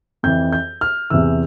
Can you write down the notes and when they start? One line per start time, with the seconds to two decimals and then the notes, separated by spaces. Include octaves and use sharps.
0.23 F2 E3 G6
0.52 G6
0.81 F6
1.10 E2 C3 E3 E6